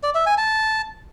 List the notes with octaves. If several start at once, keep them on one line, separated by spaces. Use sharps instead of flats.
D5
E5
G#5
A5